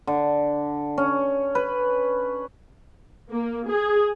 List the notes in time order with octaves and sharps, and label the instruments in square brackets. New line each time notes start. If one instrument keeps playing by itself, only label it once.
[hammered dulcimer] D3
C#4
B4
[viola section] A#3
G#4